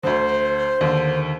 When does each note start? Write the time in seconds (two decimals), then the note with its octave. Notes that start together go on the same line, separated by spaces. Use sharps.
0.03 D2 D3 C5
0.81 D#2 D3